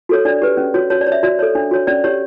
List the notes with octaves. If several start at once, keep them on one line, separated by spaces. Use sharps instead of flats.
F#4 A4 C#5
D4 D5
G4 B4
C#4
F#4 C#5
F#4 C#5
D5
C#5
E5
F#4 D5
A4 C#5
D4
F#4 C#5
C#4 D5
G4 C#5